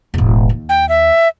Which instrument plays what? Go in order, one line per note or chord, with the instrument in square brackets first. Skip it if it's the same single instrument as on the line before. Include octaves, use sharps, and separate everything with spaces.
[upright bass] E1 A1
D#2
[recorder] G5
E5